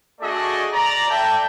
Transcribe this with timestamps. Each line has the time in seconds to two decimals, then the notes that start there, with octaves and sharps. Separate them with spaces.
0.20 A3 D4 F#4 G#4 D5 D#5
0.73 D5 A#5
1.09 A4 D5 E5 G5 A5